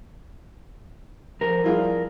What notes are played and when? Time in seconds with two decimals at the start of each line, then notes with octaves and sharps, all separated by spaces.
1.41 F2 F3 A#4
1.64 G3 E4 F4 G#4